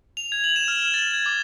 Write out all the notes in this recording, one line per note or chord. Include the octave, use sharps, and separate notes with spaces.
F7
G#6
F#7
E7
F6
F#7
A6
G#6
D6